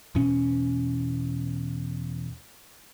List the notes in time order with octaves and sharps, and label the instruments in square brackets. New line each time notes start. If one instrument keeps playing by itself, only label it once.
[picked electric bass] E2 B2 C#4